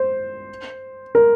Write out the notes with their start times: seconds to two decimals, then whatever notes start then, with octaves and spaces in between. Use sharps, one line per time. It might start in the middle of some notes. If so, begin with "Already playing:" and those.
Already playing: C5
1.15 A#4